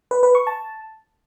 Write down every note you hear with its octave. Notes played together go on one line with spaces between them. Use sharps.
B4
B4
C#6
A5